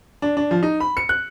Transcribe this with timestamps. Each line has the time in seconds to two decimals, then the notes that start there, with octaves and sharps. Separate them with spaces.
0.22 D4
0.37 D4
0.51 F3
0.63 D#4
0.80 B5
0.97 C#7
1.09 F#6